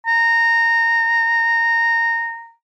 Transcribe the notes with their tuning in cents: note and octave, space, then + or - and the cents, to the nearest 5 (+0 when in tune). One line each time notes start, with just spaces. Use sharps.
A#5 -15